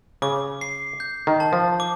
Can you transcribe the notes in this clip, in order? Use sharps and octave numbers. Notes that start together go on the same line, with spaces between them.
C#3 D6
C7
G6
D#3
A5
F3
D6